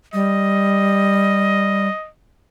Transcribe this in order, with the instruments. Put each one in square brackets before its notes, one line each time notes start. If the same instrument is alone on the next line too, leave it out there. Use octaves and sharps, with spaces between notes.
[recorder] G3 [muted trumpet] D#5